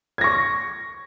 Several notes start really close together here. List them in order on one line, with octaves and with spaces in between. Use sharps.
G#6 A#6 C#6